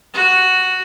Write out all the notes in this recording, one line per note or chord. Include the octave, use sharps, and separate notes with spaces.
F#4